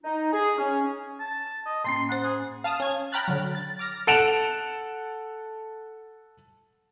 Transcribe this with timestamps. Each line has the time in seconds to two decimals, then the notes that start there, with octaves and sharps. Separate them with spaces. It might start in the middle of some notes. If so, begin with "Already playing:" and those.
0.03 D#4
0.33 G#4
0.57 C#4
1.20 A5
1.66 D#5
1.84 A2 A#3 C#4 C6
2.09 C#4 C5 F#5
2.24 G#4
2.64 F5 A5 D#6 F6
2.80 C#4 G#6
3.12 G5 A#5 B5 F6 F#6 A6
3.28 D3 F#3
3.55 A6
3.79 D6 F6 A#6
4.07 A4 F#5 D7 E7 F7